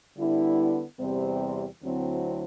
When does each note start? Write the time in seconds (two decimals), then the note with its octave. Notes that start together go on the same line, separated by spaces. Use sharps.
0.17 D3 G3 B3 E4
0.99 E2 C3 G3 C4
1.82 D2 D3 F#3 C4 E4